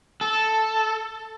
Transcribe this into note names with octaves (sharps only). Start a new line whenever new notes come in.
A4